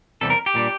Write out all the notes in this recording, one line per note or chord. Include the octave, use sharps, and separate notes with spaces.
E2 C3 E3 G3 A4
A#4
G4
A#2 G3 D4